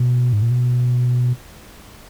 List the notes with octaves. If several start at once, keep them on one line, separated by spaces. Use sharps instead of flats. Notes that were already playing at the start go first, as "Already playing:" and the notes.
Already playing: B2
G#2
A#2
B2